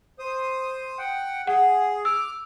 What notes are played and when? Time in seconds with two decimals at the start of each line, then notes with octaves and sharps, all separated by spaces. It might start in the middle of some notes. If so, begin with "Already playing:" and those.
0.19 C5 D#6
0.98 F#5 G5
1.47 G#4 F#5
2.05 D6 E6 F6